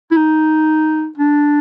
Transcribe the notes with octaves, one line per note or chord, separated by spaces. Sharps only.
E4
D#4
D4